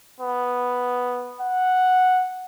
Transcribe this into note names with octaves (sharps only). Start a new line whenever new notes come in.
B3
F#5